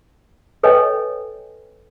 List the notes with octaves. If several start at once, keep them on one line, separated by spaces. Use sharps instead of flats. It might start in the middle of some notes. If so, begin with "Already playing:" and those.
A4 B4 C#5 D#5 G5 G#5